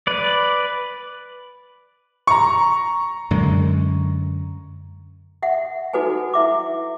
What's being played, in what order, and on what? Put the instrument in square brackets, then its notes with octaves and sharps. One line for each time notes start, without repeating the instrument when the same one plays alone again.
[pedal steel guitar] B4 D5
[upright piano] A#5 C#6
[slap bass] F#2 D3 G#3
[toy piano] E5 F#5
D#4 F#4 A4 B4 F#5 G#5
E4 E5 D6